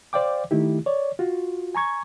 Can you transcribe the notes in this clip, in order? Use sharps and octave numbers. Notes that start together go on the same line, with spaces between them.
C5 D5 F5 G5 D6
D#3 A3 D#4 E4 G4
C#5 D5
F4 F#4
G#5 A#5 C#6 G#6